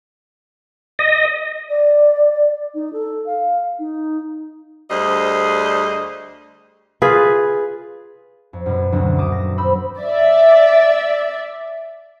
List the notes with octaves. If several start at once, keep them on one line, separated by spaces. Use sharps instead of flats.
D#5
D5
D#4
A4
F5
D#4
D2 G3 G#4 C5 D#5
F4 G#4 B4
F2
F#2 B2
D2 D3 F#3 C4
D#1 A#5 D6 D#6 E7
A#6
C5 B5 E6
D5 E5